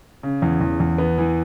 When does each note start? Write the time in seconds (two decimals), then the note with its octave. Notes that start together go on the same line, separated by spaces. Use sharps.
0.23 C#3
0.42 E2
0.61 E2
0.80 E2
0.98 B3
1.18 E3